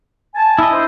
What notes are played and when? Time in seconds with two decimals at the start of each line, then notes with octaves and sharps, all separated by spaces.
0.35 G#5 A5
0.58 E4 D#5
0.72 D4 C5